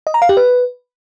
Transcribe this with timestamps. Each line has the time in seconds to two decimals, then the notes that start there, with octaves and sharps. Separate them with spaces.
0.07 D#5
0.14 A#5
0.22 F5
0.29 G4
0.37 B4